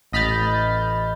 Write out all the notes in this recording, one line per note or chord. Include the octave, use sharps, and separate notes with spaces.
A1 D#5 B5 F6 G6 A6